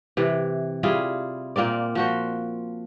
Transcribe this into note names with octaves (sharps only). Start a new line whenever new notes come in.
C3 E3
G3 E4 F4 G#4
A#2 A#3 C4 D5
F3 F#4 C5